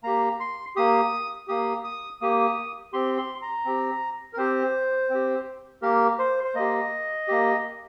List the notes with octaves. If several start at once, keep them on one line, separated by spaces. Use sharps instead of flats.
A#3 G4 A#5
C6
A#3 G4 D#6
A#3 G4 D#6
D#6
A#3 G4 D#6
C4 G4 C6
C6
A#5
C4 G4
A#4
C4 G4 C5
C4 G4
A#3 G4 A#4
C5
C5
A#3 G4 D#5
A#3 G4